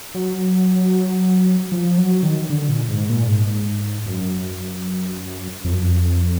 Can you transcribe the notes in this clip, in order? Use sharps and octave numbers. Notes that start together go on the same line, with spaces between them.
F#3
F3
F#3
D#3
D3
A#2
G#2
A#2
G#2
F#2
F2
F#2
F2